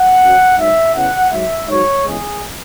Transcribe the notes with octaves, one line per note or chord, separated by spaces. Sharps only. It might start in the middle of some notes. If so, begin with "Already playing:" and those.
Already playing: F#5
F#2 F#3
G#2 F#3 E5
E2 C#3 E3 F#5
G#2 F#3 E5
G#2 F#3 C#5
E2 C#3 G#3 G#4